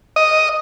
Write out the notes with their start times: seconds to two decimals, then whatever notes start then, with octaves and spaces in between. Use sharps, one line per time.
0.16 D#5